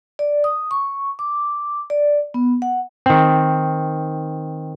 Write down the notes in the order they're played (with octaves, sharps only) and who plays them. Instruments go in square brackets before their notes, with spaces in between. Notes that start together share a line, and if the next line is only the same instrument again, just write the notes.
[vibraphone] D5
D#6
C#6
D6
D5
B3
F#5
[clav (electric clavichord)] D#3 C4